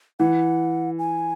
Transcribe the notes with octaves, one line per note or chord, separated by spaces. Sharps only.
E3 F#5
G#5